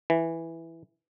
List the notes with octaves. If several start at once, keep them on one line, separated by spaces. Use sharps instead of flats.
E3